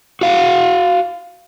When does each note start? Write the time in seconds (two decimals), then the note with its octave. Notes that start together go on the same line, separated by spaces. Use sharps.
0.21 F#4 F5 F#5